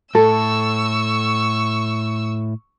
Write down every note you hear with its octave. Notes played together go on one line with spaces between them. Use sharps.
A2 A4 C#6 E6